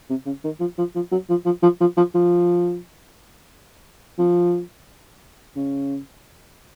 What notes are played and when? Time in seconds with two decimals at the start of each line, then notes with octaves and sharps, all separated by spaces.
0.09 C3
0.26 C#3
0.44 D#3
0.60 F3
0.78 F3
0.95 F3
1.12 F#3
1.29 F3
1.45 F3
1.62 F3
1.80 F3
1.97 F3
2.15 F3
4.18 F3
5.56 C#3